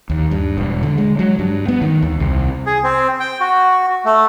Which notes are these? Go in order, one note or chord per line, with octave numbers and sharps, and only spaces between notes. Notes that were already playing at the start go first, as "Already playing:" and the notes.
D#2
G2
E1
D3
G#3
F#3
G2
B3
D#3
D#2
C2
G#4
C4
G5
F#4
A3